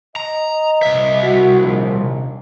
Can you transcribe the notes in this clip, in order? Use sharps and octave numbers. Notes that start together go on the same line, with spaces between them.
D#5 A#5
C2 E5
F#4
A#1 D#2